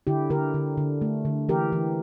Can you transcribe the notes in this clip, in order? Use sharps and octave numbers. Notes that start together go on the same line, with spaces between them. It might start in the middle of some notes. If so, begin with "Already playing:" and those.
D3 E4 G4
D3 G4 A#4
D3
D3
A3
D3
E3 G4 A#4
E3